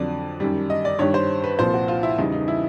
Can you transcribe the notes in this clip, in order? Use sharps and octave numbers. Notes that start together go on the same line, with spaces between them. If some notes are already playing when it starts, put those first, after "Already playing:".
Already playing: F2 D3 F#3 D5
F#2 D#3 G3
D#5
D5
G2 D#3 G3 C#5
C5
B4
C2 A#2 F3 C5
F#4
F4
E4
E2 C#3 E3 G3 D#4
D#4
E4